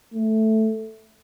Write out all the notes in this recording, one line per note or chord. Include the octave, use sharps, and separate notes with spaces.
A3